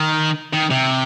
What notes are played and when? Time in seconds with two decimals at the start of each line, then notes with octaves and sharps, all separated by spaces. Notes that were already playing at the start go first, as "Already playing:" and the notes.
Already playing: D#3
0.53 D#3
0.70 C3